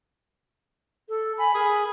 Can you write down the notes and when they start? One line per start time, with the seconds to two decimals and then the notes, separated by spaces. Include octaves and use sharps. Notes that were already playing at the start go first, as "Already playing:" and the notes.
1.09 A4
1.38 G#5 B5
1.54 G#4 A#4 G#5 D#6